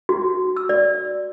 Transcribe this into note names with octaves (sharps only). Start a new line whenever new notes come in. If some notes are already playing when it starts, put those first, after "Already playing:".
F#4
E6
D5